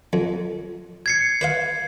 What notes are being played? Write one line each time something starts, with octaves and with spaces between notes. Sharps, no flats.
F2
G#6 C7 C#7
B4 C5 F5